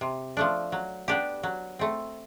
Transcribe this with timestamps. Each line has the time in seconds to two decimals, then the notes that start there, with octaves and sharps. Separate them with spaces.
0.01 C3
0.37 F3 A3 D4
0.72 F#3
1.08 B3 D4 G4
1.43 F#3
1.79 A3 C4